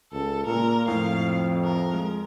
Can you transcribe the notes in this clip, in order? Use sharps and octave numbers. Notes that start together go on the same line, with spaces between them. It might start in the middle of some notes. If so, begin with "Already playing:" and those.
C#2 A4
A#2 A#4
F2 A2 F3 F5
A#4
G#3